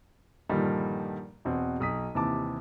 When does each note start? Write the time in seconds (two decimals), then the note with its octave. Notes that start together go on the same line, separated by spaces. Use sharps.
0.49 G2 A#2 D3 D#3 F3 G3
1.45 E2 B2 C4
1.80 B1 D#6 B6
2.14 D#2 C3 E3 A5 D6